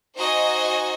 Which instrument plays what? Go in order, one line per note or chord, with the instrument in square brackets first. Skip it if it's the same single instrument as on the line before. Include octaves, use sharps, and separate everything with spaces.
[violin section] D#4 F#4 C5 D#5 G#5